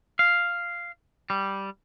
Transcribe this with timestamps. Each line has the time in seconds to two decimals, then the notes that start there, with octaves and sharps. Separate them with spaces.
0.19 F5
1.30 G3